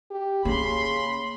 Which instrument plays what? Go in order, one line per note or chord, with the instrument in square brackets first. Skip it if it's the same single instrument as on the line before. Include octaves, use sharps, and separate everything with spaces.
[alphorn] G4
[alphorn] C#3 [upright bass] A#3 [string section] B5 C6